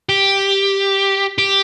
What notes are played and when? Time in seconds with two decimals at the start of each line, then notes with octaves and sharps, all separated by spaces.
0.09 G4
1.39 G4